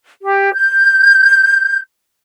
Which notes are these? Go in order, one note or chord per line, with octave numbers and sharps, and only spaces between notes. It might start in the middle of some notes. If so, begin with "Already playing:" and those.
G4
G6